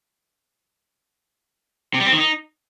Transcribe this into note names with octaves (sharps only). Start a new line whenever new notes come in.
C3
G3
C4
D#3
D#4